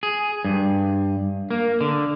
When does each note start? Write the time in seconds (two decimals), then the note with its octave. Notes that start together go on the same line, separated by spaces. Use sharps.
0.03 G#4
0.45 G2
1.51 A#3
1.81 D3